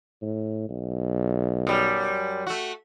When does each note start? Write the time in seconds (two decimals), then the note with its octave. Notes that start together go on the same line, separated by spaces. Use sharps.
0.22 A2
0.69 B1
1.67 F#2 G3
2.47 A3 F#4